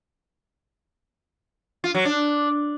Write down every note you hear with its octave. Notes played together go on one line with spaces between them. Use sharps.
F4
F#3
D4